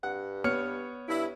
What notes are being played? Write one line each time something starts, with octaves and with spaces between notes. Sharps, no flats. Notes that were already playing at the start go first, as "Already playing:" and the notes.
G2 F#5
B3 C#5 F6 C#7
G2 E4